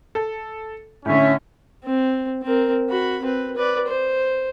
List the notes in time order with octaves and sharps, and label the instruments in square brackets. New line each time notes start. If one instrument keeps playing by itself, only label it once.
[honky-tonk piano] A4
[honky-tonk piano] A2 D3 [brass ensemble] C#4 [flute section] E5
[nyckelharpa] C4
C4 A#4
F#4 B5
C4 B4
B4 D5
C5